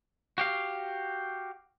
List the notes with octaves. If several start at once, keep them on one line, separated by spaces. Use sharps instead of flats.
F#4 G4 F5